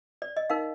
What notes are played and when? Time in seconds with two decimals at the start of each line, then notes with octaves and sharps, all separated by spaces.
0.22 D5
0.37 D#5
0.50 D#4 A#4 F5